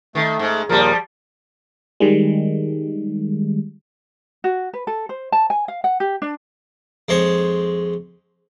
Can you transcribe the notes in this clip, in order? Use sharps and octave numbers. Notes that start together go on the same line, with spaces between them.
D#3 A3
G#2
D#2 A#2 F3 G3 A#4
D#3 G3 G#3
F#4
B4
A4
C5
A5
G#5
F5
F#5
G4
D4
F2 G#3 C5 C#5